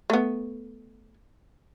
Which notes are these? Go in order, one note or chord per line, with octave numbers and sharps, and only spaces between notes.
A3 B3